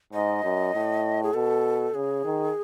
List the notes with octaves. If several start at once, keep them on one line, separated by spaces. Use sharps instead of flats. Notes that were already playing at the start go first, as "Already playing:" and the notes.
G#2 D#5
F#2
A2
G#4
B2 A4
C#3 G#4
D#3